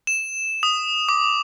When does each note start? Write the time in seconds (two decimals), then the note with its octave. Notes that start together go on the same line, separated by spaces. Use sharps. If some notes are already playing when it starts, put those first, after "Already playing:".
0.07 E7
0.63 D#6
1.09 D6